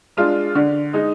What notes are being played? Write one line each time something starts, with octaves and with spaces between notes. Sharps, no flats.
G#3 D4 F4
D3
G#3 D#4